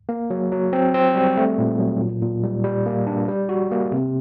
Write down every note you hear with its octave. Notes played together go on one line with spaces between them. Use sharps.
A#3
F#3
F#3
C4
C4
G3
A3
A#2
F#3
A#2
A#2
G3
G3
A#3
D4
G3
F#4
A#3
C3